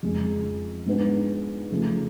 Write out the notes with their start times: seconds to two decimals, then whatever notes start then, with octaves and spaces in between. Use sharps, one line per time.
0.03 F2 C#3 G#3
0.86 G#2 G#3 B3 D4
1.71 C#3 F3 A3 C#4